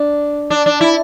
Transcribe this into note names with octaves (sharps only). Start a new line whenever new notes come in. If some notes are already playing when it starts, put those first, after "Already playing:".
Already playing: D4
D4
D4
E4